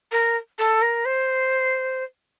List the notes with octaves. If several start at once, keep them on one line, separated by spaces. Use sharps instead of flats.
A#4
A4
A#4
C5